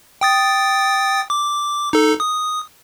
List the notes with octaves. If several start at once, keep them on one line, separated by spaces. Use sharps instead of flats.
G5 D#6 A6
D6
D#4 A4
D#6